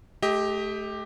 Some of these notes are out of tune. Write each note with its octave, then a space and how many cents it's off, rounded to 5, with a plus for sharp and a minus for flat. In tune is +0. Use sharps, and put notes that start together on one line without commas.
A3 -25 G4 +10 D#5 +25